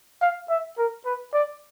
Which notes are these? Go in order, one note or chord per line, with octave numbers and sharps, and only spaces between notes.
F5
E5
A#4
B4
D5